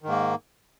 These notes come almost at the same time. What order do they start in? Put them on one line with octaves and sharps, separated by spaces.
D#3 G#2 A#3